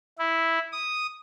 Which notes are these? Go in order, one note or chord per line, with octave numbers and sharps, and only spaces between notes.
E4
D#6